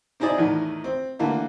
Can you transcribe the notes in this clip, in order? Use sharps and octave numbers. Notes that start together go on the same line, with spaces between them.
C4 D#4 E4 G#4 D5
E2 A2 D#3
C4
D3 E3 A3 A#3